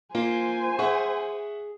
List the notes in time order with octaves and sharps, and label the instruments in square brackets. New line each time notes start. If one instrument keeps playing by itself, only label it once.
[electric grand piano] A#3 [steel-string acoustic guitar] F4 [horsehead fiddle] C5 G#5
[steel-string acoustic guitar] G#4 [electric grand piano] E5 F#5 C#6